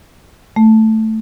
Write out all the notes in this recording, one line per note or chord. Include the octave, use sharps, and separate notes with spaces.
A3